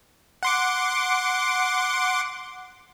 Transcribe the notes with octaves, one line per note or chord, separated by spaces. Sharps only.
F#5 C6 D6